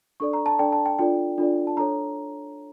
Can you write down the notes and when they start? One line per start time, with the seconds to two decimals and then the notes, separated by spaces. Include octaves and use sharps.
0.20 D4 A4 D5 C#6
0.33 A#5
0.46 A5
0.59 D4 A4 D5 G5
0.72 A5
0.85 G5
0.99 D4 F4 A4 D5 G5
1.38 D4 F4 A4 D5
1.67 A5
1.77 D4 A4 C#5 A#5